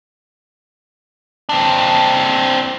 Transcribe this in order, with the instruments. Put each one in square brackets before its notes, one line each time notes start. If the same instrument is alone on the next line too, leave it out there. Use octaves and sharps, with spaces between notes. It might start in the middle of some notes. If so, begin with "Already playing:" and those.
[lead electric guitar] C4 D4